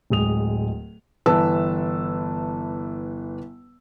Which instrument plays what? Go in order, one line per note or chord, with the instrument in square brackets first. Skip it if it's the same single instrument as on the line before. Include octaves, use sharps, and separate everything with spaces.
[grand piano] D1 G#3 D#6 F7
[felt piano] G1 E3 B4 A5 E6